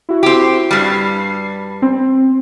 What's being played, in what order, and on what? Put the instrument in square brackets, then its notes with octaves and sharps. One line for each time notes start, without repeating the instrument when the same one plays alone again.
[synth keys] E4 F#4
[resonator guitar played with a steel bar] C4 G4
[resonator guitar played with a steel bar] G2 G3 [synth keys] C7
[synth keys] C4